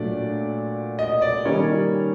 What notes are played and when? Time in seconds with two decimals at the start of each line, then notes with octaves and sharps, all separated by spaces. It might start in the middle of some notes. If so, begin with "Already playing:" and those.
Already playing: A#2 F#3 A3 D4 D5
0.99 D#5
1.22 D5
1.45 D#3 G3 A#3 C#4 C#5